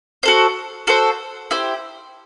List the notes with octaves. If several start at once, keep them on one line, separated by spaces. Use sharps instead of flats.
F#4 A4 C5
F#4 A4 C5
E4 G4 C5